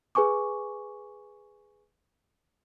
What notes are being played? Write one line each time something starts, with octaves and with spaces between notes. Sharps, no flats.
G#4 B4 G#5 C#6 D6